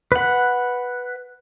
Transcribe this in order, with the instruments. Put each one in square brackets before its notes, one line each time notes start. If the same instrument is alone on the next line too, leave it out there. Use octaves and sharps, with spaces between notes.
[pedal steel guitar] B4 F#5